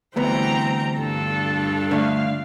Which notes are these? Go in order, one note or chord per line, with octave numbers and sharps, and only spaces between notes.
D2 E3 G3 A3 B3 C4 A#5
G2 D4 F4 A4
D3 A3 F5